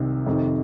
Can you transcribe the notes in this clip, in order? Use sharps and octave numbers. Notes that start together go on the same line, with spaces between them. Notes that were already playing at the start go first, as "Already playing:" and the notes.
Already playing: C2 C3 D#3
F2 C3 D#3